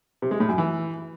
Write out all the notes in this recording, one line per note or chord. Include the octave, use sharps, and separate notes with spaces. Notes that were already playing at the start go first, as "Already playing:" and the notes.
C3
G#3
A2
F#2
E3